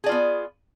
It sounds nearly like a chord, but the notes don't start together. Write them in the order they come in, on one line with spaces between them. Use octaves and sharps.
G#4 D5 F4 B3